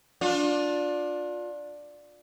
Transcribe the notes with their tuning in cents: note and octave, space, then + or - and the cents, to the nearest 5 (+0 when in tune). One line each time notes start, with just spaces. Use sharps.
D4 +0 F4 +30